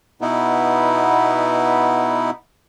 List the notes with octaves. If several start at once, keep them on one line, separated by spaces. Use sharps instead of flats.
B2 B3 D#4 E4